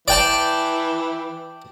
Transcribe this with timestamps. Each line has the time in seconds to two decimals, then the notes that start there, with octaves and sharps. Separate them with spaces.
0.08 E3 D5 G5 A5